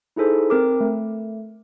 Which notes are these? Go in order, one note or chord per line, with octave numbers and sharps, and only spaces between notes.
D#4 E4 G#4 A4 C5
C4 A#4 D6
A3